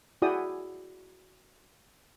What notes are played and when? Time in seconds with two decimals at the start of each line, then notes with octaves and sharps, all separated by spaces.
0.22 E4 F#4 G#4 D5 G5 D#6